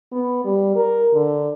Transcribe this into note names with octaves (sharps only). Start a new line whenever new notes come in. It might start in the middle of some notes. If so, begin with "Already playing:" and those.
B3
G3
A#4
D3